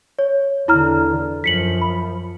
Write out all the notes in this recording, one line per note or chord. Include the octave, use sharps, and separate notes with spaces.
C#5
E2 D3 E4 A#5 F6
F#2 F3 B6 C#7 F#7
B5